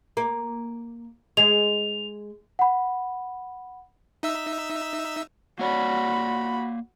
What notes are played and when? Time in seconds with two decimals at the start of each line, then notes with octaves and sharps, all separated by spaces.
0.17 A#3
1.37 G#3 F7
2.59 F#5 B5
4.23 D#4 E5 E6
5.59 A#3 F#4 C#5 D5 B5